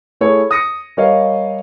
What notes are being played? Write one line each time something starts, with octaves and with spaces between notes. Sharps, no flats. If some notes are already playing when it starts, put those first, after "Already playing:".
A3 E4 G#4 A4 C#5
D#6 A#6 C#7
G3 A#4 C#5 D#5 F5